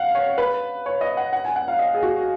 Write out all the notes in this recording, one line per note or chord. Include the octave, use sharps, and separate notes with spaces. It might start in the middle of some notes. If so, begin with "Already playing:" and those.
Already playing: F5 F#5
C#5
B4
C#5
D#5
F#5
F#5
G#5
F#5
F5
D#5
G#4
F#4